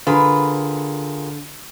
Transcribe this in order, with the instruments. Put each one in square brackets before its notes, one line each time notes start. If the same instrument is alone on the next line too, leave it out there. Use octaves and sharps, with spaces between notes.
[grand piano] D3 [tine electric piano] F4 G#4 A#4 [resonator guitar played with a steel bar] B4